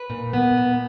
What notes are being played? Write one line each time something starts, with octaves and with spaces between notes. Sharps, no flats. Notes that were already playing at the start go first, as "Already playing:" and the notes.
Already playing: B4
A#2
B3
A#2